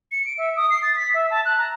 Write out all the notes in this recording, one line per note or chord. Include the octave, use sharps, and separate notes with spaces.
C#7
D7
E5
D#6
C7
A6
B6
E5
A5
F#6
A#5